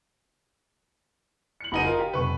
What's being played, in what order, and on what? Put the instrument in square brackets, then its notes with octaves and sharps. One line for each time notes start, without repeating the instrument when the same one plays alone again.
[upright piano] C#7 F#7
[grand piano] F#1 D#4 D#7 [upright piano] B4 F#5 B5
[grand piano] F4 A#4 [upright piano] D#5
[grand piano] G4
[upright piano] F1 B1 C#6 [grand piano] B4